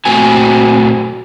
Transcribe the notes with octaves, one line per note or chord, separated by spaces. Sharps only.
A#2 A3 C4 F#4 G#5